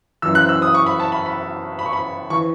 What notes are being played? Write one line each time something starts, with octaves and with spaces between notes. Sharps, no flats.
F#2 E3 E6
F#6
E6
D#6
C#6
B5
A5
B5
B5
B5
C#6
B5
E3 C#6